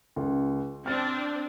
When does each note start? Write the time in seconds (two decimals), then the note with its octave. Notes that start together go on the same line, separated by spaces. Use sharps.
0.16 C#2
0.86 C4 D4 F6 A6